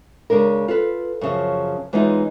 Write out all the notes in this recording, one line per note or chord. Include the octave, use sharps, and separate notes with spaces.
C#3 G#3 D4 A#4
F4 A4 B4
F#2 C#3 F3
E3 G#3 B3 C#4 D#4 F4